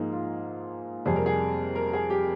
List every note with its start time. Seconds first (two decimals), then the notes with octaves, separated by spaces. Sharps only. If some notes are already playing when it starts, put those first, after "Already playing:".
Already playing: G#2 F3 A#3 D#4 G#4
0.12 F4
1.05 F2 C3 G3 G#4
1.16 A#4
1.26 G#4
1.75 A#4
1.93 G#4
2.10 G4